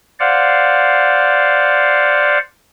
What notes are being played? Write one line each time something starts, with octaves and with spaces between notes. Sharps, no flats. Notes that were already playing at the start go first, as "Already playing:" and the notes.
C5 D5 F5 F#5